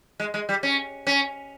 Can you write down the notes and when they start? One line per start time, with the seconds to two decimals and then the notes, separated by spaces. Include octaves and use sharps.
0.20 G#3
0.34 G#3
0.49 G3
0.63 C#4
1.07 C#4